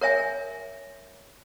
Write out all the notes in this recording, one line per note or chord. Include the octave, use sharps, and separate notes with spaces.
A#4 C#5 E5 G#5